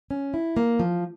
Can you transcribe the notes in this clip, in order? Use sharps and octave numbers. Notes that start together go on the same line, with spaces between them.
C#4
E4
A#3
F3